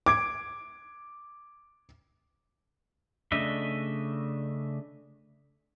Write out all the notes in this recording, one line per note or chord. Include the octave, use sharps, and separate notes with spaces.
D6 G#6 D7
C#3 A3 D4 D#5 E5